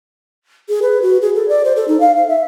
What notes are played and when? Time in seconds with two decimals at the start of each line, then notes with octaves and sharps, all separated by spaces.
0.69 G#4
0.82 B4
1.02 F#4
1.22 G#4
1.35 A4
1.49 D5
1.65 C5
1.76 A4
1.88 D#4
2.00 F5
2.16 F5
2.28 E5